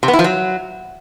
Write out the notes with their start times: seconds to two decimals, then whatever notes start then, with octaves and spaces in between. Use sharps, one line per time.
0.03 C3
0.08 B3
0.13 E4
0.19 F3
0.24 F#3